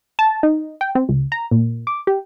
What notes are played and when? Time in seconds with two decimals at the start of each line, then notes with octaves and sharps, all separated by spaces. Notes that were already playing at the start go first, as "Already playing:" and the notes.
0.19 A5
0.43 D#4
0.81 G5
0.95 C4
1.09 C#2
1.32 A#5
1.51 A#2
1.87 D6
2.07 G4